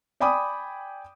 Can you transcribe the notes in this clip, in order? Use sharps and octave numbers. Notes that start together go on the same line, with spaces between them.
D5 G5 G#5 B5 D6 D#6